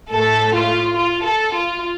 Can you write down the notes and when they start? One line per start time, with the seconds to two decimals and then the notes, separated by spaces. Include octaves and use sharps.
0.11 A2 A3 A4
0.54 F4
0.97 F4
1.24 A4
1.53 F4